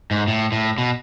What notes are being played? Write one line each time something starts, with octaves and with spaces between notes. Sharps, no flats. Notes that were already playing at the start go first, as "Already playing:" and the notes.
G#2
A2
A2
B2